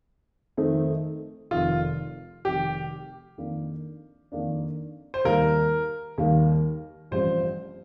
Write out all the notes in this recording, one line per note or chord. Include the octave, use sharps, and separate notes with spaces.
F2 D#3 A3 C4 D#4
F1 F2 D#3 F4
F1 F2 D#3 G4
F2 D#3 A#3 D4
F2 D#3 A#3 D4
C5
D#2 D#3 G3 A#3 A#4
D#2 D#3 G3 A#3
A1 G2 F3 C4 G4 C5